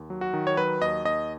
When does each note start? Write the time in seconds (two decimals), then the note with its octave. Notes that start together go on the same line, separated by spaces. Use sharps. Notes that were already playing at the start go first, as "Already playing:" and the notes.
Already playing: D#2
0.10 F#3
0.21 F#4
0.33 D#3
0.47 C#5
0.57 F#3 B4
0.81 D#2 D#5
1.05 D#2 D#5